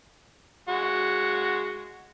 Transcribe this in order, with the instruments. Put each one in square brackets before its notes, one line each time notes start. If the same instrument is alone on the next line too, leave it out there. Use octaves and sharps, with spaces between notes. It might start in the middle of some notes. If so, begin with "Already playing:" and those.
[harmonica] G#3 F#4